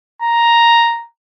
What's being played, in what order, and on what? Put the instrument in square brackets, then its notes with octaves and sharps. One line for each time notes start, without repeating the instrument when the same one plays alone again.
[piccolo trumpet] A#5